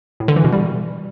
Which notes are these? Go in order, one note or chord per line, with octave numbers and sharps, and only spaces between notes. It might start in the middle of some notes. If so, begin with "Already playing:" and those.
A2
D3
E3
B2
G3